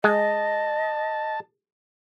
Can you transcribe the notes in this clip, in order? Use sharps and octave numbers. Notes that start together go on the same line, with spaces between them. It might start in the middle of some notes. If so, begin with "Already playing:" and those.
G#3 D#5 A5